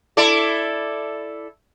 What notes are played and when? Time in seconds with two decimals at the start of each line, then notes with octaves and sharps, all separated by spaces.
0.17 E4 A4 D5